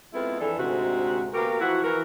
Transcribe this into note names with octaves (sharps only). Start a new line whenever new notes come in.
G#3 B3 C4 E4 F4 A4
F2 E3 D4 A4
D2 G#2 C3 G#3 F#4
A#3 B3 F#4 G4 A#4
E3 F3 E4 F#4
E3 F#4 A#4